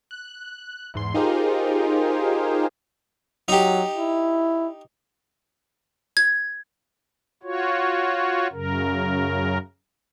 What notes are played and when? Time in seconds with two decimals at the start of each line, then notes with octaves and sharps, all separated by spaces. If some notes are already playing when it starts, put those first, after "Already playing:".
0.11 F#6
0.94 E2 G#2 C6
1.14 D#4 F4 G4 G#4 A#4 C5
3.48 F#3 D#4 G4
3.97 E4
6.17 G#6
7.43 F4 F#4 C#5
8.52 F#2 C#3 A#4